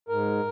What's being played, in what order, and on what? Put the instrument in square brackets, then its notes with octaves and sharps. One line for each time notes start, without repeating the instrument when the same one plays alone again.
[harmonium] G#2 A#4